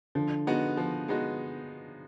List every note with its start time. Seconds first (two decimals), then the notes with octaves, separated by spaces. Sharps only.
0.15 D3 F3
0.47 G#3 B3 D#4 F#4
0.77 F3
1.08 G#3 B3 D#4 F#4